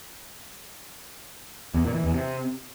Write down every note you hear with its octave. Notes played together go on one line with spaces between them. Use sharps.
E2
A#2
E3
E2
C3